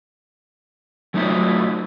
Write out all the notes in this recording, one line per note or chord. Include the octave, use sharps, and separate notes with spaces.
F#3 A3 C4 D#4 F4 E5